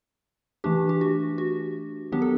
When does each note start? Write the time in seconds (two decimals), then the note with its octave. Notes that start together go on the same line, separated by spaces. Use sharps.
0.64 E3 A3 D4 G4
0.89 G4
1.01 F#4
1.38 F#4
2.12 D#3 F#3 B3 D4 G4
2.22 A4